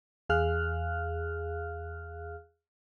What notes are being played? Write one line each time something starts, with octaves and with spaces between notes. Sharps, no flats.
E2 G#4 F5 F6 F#6